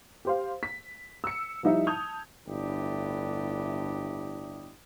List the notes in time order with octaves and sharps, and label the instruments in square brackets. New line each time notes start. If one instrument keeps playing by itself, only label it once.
[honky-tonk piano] G4 C5 F5
B6
E6 C#7
F3 G3 D#4 E4 E5
A5 D#6 G6 G#6 F7
[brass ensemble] G1 A2 D4 E4 G4 D#5